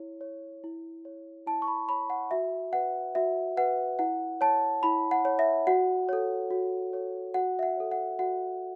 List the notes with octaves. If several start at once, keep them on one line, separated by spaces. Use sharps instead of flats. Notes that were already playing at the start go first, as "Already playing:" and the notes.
Already playing: E4 C#5
C#5
E4
C#5
E4 A5
C#6
B5
C#5 B5
F#5
F#4 E5
B4 F#5
F#4 E5
B4 F#5
E4 F#5
C#5 A5
E4 B5
F#5
C#5
E5
F#4 F#5
A4 C#5
F#4
A4 C#5
F#4 F#5
E5
F#5
A4 C#5
F#5
F#4 F#5